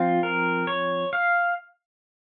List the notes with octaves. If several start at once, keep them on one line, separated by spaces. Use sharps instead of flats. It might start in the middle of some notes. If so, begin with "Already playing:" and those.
Already playing: F3 C4 F4
A#4
C#5
F5